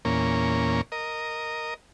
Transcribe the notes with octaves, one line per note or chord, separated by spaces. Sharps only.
E2 A#2 A#3 C#4
A#4 D#5